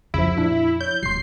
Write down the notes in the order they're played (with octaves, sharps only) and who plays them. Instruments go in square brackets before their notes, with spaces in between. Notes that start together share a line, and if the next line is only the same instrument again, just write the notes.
[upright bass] F2 [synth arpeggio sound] C#3 F3 [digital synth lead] E4
[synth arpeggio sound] A#2 D4 E5
[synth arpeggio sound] C#5 [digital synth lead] G6
[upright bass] D#1 [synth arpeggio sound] C6 G6 [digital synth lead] C7